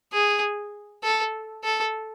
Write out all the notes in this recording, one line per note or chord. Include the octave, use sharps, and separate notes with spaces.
G#4
A4
A4